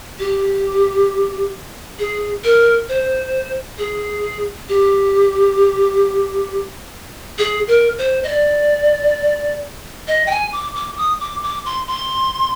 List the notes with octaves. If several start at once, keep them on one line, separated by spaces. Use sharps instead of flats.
G4
G#4
A#4
C5
G#4
G4
G#4
A#4
C5
D#5
D5
D#5
G5
G#5
D6
D6
D#6
D6
D6
C6
C6